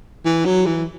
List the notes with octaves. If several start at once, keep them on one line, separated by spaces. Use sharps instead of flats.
E3
F#3
E3